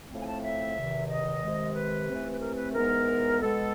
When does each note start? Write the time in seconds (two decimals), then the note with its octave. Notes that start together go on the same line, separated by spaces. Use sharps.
0.11 A2 F3 A3 C4
0.22 G#5
0.27 A5
0.43 E5
0.76 E2 C3 D#3
1.09 D#5
1.43 C3 D#3 G#3
1.75 B4
2.09 C3 E3 A3 C4
2.34 B4
2.42 A#4
2.58 B4
2.74 G#2 E3 G#3 B3 A#4
3.40 B2 G#3 B3 A4